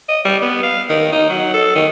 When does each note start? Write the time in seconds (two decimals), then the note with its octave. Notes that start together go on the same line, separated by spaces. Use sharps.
0.08 D#5
0.25 G3
0.42 B3
0.63 F5
0.89 D#3
1.12 D#4
1.30 F#3
1.54 A4
1.75 D#3